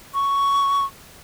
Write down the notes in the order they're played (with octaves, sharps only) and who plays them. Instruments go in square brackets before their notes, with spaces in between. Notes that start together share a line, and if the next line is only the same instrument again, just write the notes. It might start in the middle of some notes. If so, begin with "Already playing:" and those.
[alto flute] C#6